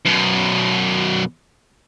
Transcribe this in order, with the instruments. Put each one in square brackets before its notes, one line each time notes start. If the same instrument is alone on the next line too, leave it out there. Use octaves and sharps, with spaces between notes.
[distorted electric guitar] F#2 B2